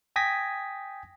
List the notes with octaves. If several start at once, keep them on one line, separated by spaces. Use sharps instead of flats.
G5 G#5 D#6 G#6 A#6 B6